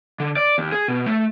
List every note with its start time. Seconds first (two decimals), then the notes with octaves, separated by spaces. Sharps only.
0.20 D3
0.37 D5
0.58 D#2
0.72 G#4
0.88 B2
1.06 A3